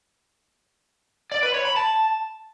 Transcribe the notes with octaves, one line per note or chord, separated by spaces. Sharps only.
D5
B4
C#5
B5
A5